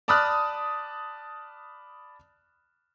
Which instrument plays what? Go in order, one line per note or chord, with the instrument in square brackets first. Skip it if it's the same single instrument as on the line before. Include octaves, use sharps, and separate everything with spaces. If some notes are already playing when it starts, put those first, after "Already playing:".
[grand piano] D5 A5 B5 D#6 F6 F#6